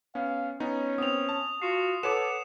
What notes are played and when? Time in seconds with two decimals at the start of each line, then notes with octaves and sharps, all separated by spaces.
0.15 B3 C#4 F5
0.60 B3 C#4 D#4
0.98 B3 C4 D#6 F7
1.29 A5
1.62 F4 F#4 C7
2.03 A4 B4 C#5 F#5 D6 E7